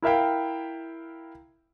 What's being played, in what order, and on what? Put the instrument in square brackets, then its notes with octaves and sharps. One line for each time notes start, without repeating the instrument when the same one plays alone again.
[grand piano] E4 A#4 E5 F5 G5